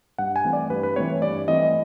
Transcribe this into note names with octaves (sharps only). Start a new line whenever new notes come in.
G2 F#5
G#5
E3 A3 C4
D5
G2 B4
B4
E3 A3 C4 C#5
G2 D5
E3 A3 C4 D#5